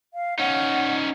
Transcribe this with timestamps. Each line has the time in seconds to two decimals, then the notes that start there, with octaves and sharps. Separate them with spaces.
0.14 F5
0.39 C#4 D#4 F#5